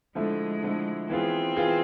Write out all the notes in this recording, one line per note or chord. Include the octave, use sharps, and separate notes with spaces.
D3 F3 G#3 A3 E4
D3 F3 A3 E4
E3 B3 C4 F4 G#4
E3 B3 F4 G#4